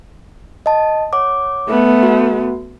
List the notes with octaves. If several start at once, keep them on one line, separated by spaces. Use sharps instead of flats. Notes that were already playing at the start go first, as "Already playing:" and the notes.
D#5 A5
C#5 F#5 D6
A3 B3
F#4